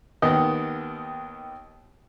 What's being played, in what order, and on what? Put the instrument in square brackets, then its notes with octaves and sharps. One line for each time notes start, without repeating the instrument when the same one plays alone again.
[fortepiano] D#2 D#3 B3 D#5